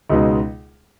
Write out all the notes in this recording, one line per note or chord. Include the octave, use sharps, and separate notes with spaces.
C#2 B2 G#3 D#4